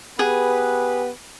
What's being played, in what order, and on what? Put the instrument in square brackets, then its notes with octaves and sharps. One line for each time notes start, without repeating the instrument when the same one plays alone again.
[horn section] B3 G4 B4 [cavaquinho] G#4